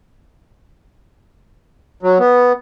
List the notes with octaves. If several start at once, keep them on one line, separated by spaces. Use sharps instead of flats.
F#3
B3